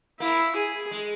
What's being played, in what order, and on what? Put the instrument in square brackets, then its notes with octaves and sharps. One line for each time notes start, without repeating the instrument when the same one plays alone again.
[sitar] A#3 [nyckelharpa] E4
[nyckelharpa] G#4
[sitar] G#3